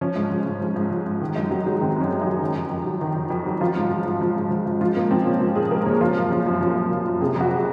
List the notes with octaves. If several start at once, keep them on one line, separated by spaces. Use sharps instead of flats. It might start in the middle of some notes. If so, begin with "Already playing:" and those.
F3 C#4
G#2
F3
G#2
F3
G#2
F3
G#2
D#3
F#2 D#4
F#2 F#3
F#3 G#3
D#3 C4
F#2 C#4
F#2
D#4
F#3
D#3
F2
F2
F#3
D#3
F2
F2
F#3
F3 F4
G#2
F3
G#2
F3
G#2
F3
G#2
F3 F4
A#2 A#3
F3 C4
A#2 C#4
F3
A#2 G#4
F3 A#4
A#2 C#5
F3 F4
F#2
F3
F#2
F3
F#2
F3
F#2
C3 G#4
F2 F#4